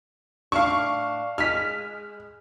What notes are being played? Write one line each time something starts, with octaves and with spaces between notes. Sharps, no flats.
A2 D4 F5 C#6
G#3 F6 B6